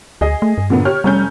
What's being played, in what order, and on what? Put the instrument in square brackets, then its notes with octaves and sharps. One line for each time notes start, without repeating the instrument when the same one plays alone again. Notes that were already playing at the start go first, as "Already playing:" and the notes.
[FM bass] D2 [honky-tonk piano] G#4 D#5
[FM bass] A3
G2
[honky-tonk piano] A#2 D3 B3
G4 C#5 F6
[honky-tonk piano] F1 C#4 G6 [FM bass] G3